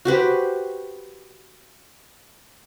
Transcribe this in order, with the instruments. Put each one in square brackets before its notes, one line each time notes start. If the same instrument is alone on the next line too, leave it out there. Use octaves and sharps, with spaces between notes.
[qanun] F#4 G4 B4 C5